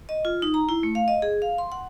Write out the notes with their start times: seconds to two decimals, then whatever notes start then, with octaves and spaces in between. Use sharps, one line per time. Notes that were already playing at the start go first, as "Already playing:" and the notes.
0.09 D#5
0.25 F4
0.42 D#4
0.54 A#5
0.69 E4
0.83 A3
0.95 F5
1.08 D#5
1.22 G#4
1.42 F5
1.58 C6
1.72 F#5